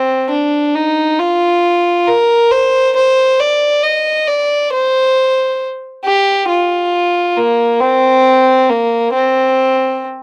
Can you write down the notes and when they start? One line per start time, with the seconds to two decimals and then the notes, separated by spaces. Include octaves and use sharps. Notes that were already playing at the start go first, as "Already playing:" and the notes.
Already playing: C4
0.30 D4
0.75 D#4
1.19 F4
2.07 A#4
2.51 C5
2.96 C5
3.40 D5
3.83 D#5
4.27 D5
4.73 C5
6.05 G4
6.49 F4
7.37 A#3
7.81 C4
8.69 A#3
9.13 C4